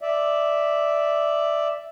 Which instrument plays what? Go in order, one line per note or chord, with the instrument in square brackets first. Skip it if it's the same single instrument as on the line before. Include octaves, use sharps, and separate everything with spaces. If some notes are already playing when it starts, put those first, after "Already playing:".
[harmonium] D5 E5